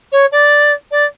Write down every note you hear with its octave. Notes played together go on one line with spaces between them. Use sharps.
C#5
D5
D5